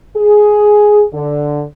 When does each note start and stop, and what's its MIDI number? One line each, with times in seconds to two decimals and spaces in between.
0.16 1.03 68
1.13 1.62 50